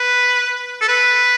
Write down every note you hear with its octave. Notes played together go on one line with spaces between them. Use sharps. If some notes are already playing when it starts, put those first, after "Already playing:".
Already playing: B4
A4
B4